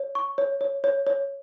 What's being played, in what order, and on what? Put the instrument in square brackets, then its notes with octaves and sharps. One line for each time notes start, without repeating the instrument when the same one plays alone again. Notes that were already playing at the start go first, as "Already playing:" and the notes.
Already playing: [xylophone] C#5
C#6
C#5
C#5
C#5
C#5